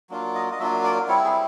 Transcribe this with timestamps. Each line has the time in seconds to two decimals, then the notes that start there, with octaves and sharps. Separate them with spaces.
0.10 F#3 A#3 D4 F4
0.35 D#5
0.51 D#5
0.59 F#3 A#3 D4 F4 E5
0.84 D5
1.08 G3 C4 E4 C#5
1.24 G#4